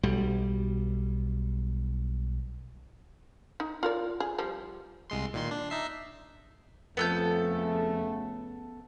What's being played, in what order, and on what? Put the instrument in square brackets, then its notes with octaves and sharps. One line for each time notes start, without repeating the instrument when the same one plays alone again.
[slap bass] B1 G3
[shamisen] D#4
F4 A#4 D5
G#4
F3 G3
[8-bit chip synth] C2 G#3 C6
A#2 D#3 C6
D4
D#4 E5 C7
[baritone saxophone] F2 [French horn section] C#3 A3 [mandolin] B3 A4 G6